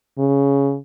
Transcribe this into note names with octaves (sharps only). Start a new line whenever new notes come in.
C#3